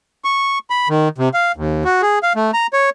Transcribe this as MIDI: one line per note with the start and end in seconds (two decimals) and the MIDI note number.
0.24 0.58 85
0.70 0.88 83
0.89 1.08 51
1.18 1.29 48
1.34 1.52 77
1.56 1.84 39
1.85 2.02 66
2.02 2.19 68
2.23 2.33 77
2.36 2.51 57
2.54 2.67 82
2.73 2.90 73